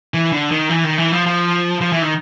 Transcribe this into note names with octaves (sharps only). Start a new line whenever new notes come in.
E3
D3
D#3
E3
D#3
E3
F3
F3
F3
E3
D#3